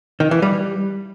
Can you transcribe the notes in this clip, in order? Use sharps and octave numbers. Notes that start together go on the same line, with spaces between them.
D#3
E3
G3